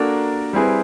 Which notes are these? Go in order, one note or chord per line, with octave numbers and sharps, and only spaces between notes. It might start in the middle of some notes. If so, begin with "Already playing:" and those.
Already playing: A#3 D4 F#4 A4 A#4
G3 C4 E4 G#4 B4